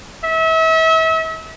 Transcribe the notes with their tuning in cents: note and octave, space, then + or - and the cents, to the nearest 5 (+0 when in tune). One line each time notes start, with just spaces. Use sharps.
E5 -35